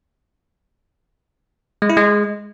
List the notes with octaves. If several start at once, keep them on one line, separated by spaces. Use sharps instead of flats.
G#3
E4
G#3